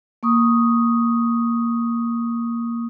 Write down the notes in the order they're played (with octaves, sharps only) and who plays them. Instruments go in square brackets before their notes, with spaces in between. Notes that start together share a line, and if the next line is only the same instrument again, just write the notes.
[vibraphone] A#3 C#6 D#6